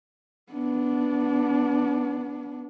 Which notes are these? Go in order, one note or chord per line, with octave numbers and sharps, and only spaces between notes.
B3 D4